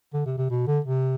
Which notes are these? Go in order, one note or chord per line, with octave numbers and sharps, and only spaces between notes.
D3
C3
C3
B2
D3
C3